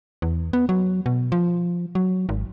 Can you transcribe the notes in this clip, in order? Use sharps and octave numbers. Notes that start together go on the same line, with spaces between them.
E2
B3
F#3
B2
F3
F#3
G#1